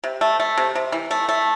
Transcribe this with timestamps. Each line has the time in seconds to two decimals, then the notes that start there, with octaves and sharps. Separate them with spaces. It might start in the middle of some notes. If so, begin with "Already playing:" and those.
0.04 C3
0.21 A3
0.40 A3
0.57 C3
0.75 C3
0.92 E3
1.11 A3
1.29 A3